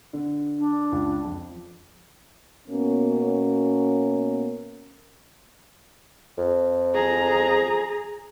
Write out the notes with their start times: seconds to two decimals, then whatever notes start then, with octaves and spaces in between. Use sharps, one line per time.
0.13 D3
0.59 D4
0.92 C#2
1.25 F2
2.68 B2 A#3 B3 C#4
6.38 F2
6.95 G#4 A#5